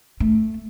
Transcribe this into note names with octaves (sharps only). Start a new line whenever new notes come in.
A3